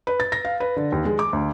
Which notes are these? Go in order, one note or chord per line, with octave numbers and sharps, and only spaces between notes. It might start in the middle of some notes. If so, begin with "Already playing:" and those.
B4
A6
A#6
F5
B4
D3
D#2
G#3
D6
D2